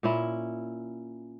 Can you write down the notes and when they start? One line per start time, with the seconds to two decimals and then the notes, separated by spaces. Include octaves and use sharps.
0.03 A#2 C#4 E4